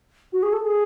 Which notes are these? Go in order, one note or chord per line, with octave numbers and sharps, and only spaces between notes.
F#4
G#4
A4
G#4